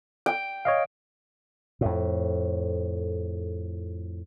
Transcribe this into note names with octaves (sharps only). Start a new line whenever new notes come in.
G5
C#5 D#5 F5
F2 A2